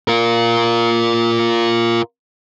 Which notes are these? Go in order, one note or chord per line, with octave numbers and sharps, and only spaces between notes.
F4 A#4